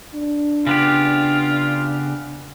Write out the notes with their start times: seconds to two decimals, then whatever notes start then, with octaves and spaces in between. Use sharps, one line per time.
0.15 D4
0.67 C#3 B3 F4 G4